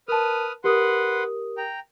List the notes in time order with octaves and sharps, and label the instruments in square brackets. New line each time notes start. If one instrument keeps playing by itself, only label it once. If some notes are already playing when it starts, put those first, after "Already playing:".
[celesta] A#4 A5 [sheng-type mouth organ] B4 D#6 F6
[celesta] G4 A#4 D#6 [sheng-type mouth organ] B4 F#5 C6
[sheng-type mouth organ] G5 A#5